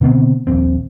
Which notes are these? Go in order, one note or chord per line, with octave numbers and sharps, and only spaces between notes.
B2 D3 B3 C4
D#1 A#1 C4